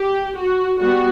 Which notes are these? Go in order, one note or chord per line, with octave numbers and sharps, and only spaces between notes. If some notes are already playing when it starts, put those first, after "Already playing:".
Already playing: G4
F#4
G3 B3 F#4